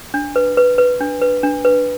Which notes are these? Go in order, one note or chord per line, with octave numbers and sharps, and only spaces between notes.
D4
B4
B4
B4
D4
B4
D4
B4